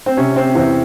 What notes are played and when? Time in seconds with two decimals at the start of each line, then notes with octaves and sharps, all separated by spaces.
0.06 C4
0.17 C3 C#4
0.36 C4
0.55 E2 C4